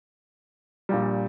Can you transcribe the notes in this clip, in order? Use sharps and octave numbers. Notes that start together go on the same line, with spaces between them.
A#1 A#2 G3